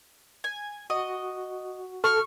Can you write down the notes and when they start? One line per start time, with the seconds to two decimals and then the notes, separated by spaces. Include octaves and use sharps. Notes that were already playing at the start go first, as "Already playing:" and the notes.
0.44 G#5
0.90 F#4 D#5
2.04 A4 C#6 F6